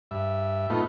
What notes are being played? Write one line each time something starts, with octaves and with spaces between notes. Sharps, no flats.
G2 E5
A2 A3 B3 D#4 F4